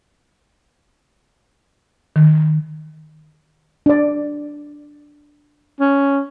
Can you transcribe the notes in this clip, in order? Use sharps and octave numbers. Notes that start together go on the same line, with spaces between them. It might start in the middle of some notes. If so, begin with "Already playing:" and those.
D#3
D4 D5
C#4